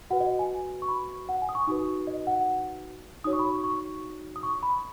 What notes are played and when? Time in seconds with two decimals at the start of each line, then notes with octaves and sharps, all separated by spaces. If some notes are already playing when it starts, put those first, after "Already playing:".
0.10 F#4 B4 F#5
0.21 D#5
0.39 G#5
0.82 C#6
0.88 B5
1.29 F#5
1.42 G#5
1.49 D#6
1.55 C#6
1.67 D#4 F#4 B4 D#6
2.07 D#5
2.27 F#5
3.24 D#4 F#4 C#5 D#6
3.33 C#6
3.39 B5
3.47 C#6
3.64 C#6
4.36 D#6
4.43 C#6
4.63 B5